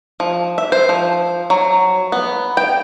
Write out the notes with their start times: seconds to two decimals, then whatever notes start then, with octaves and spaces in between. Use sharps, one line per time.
0.20 F3
0.58 E5
0.72 C5
0.89 F3
1.50 F#3
2.12 B3
2.57 G5